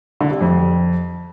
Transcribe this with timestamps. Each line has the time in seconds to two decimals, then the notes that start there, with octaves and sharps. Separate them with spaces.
0.21 D3
0.31 C3
0.41 F2